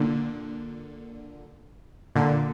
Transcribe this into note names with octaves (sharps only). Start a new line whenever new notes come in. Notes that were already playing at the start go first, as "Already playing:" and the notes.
Already playing: A#2 D3
A#2 D3